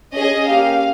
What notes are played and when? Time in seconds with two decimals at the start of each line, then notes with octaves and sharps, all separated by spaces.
0.13 C#4 G#4 D#5
0.46 A#3 C#4 G4 F5